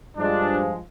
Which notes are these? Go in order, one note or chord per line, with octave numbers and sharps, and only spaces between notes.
G2 F3 G#3 D4